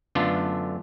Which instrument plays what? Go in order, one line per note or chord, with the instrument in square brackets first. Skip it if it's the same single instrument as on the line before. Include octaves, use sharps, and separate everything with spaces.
[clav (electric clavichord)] F#2 D3 A3 B3 D4 F4